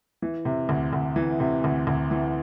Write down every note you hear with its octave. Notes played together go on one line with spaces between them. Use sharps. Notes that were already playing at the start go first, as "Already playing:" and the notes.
E3
C3
D2
D2
E3
C3
D2
D2
E3